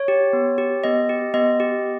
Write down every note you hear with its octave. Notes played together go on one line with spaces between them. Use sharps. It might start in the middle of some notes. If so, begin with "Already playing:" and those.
Already playing: C#5
G4
B3
G4
B3 D#5
G4
B3 D#5
G4